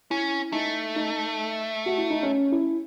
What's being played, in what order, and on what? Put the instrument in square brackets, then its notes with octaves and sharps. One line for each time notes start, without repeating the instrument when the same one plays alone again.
[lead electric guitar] C#4 [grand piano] E4
[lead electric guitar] A3 [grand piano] D#4
[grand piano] D#4
F#4
E4
D#4
C#4
E4